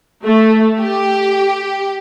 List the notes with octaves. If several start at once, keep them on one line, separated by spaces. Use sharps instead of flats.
A3
G4